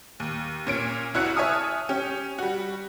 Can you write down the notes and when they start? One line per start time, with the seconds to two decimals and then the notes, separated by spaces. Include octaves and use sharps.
0.20 D#2
0.67 A#2 C#4 D7
1.14 C2 E4 F#4 C#5 F#6 C#7
1.36 C#5 E5 G#5 A5 D#6 F6
1.89 C#4 G4
2.39 G3 F#4